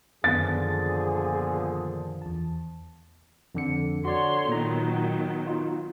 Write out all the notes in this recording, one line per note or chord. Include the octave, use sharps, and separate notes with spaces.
F#2 A#2 D3 D#3 F3 B3 G#4 A6
E2 A5
F2 D3 C#7
D3 F#4 C#5 D5 C6
A#2 D#3 F#3 B3 A#5
D#4 F4